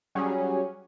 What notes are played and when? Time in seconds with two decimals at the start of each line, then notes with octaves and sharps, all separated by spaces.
0.15 F#3 G3 C#4 G#4